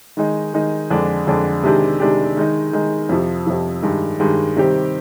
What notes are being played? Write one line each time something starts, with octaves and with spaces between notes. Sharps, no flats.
D#3 G#3 D#4
D#3 G#3 D#4
F2 D3 G#3 D4
F2 D3 G#3 D4
C3 D#3 G#3 D4 G4
C3 D#3 G#3 D4 G4
D#3 G#3 D#4
D#3 G#3 D#4
F2 C3 F3
F2 C3 F3
G2 D#3 G#3
G2 D#3 G#3
C3 D#3 G3 C4 G4